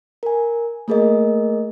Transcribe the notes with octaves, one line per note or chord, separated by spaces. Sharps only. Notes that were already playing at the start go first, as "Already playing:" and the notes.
A#4 G#5
A3 A#3 G#4 A#4 D#5